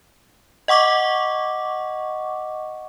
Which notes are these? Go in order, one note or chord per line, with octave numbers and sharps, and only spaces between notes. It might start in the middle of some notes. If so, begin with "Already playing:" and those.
D#5 F#5 C#6 D6